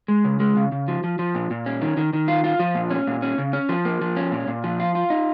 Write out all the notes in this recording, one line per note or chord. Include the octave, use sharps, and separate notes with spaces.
G#3
C#3
G#3
C#3
C#3
F3
F3
F3
A#2
A#2
C#4
D#3
D#3
D#3
F4
F4
F3
A#2
C#4
A#2
C#4
C#3
C#4
F3
A#3
F3
C#4
A#2
A#2
F3
F4
F4
D#4